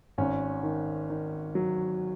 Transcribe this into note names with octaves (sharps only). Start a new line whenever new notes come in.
G#1 C#4
D#3
D#3
F#3